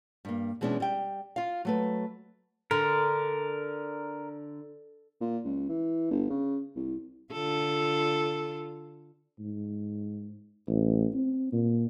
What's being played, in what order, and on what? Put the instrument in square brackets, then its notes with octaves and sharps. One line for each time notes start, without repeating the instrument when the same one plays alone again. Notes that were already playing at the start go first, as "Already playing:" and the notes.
[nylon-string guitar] G2 A#3
B2 E3 G#3 C#4 D4
G3 G5
F4 F5
F#3 A3 B4
[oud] D3 [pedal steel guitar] A#4
[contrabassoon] A#2
C#2
E3
G1
C#3
C2
[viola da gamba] D3 F4 A4
[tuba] G#2
A1
C4
A#2